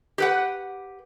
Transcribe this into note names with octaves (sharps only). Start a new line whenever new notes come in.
G4 B4 F#5